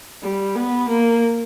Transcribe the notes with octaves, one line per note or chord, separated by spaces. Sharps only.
G3
B3
A#3